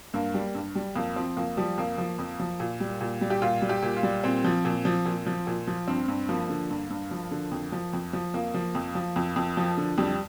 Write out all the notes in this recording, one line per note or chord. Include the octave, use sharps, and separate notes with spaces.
G2 A#3
G3
G2
G3
F2 A#3
F3 C4
F2 A#3
F3 G3
F2 A#3
F3
F2
F3
A#2
G3
A#2
G3
G4
A#2 F4
G3
G4
A#2
F4
G3
A#2 C4
F3
A#2
F3
A#2
F3
A#2
F3
G2 C4
G2
F3 A#3
D3
G2
G2
F3
D3
F2
F3
F2
F3
F2 A#3
F3
F2
F3
F2
F2
F3
D3
F2 G3